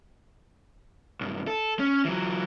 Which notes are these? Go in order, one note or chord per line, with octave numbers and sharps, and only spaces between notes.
B1 G2
A4
C#4
E3 F#3